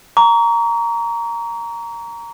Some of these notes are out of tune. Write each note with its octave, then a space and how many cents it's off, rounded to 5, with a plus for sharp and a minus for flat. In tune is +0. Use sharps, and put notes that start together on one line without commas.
A#5 +0 C#6 +40